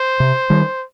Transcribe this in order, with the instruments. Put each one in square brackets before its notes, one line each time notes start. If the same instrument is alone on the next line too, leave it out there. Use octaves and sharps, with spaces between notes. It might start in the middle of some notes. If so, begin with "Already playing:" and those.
Already playing: [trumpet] C5
[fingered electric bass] C3
D#3 G3